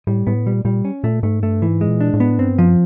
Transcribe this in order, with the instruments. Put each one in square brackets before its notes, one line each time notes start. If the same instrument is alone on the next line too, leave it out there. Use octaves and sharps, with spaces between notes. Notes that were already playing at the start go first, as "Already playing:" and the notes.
[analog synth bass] A2 [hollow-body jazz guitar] G3
[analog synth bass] A2 [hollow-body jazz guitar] B3
[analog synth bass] A#2 [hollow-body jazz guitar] G3
[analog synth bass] A#2 [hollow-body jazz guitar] G3
[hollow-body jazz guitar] C#4
[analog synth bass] A#2 [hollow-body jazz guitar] A3
[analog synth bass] G#2 [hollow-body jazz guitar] A3
[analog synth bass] G2 [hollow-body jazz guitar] A3
[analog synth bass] G#2 [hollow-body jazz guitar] E3
[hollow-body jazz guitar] G#3
[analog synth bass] A#2
[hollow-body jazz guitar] D4
[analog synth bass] A2
[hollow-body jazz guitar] B3
[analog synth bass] G2 [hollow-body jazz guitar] C4
[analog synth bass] F#2 [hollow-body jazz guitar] F3